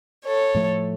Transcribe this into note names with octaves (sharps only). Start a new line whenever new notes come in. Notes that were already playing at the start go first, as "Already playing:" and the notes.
A4 C#5
A2 F3 A3